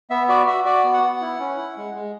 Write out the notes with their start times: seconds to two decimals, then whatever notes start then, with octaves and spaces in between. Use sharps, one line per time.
0.10 B3 E5
0.29 F#4 D5
0.47 F#4 E5
0.65 F#4 D5
0.84 B3
0.93 F#5
1.03 B3
1.21 E4
1.40 C#4
1.57 E4
1.77 G#3
1.95 G#3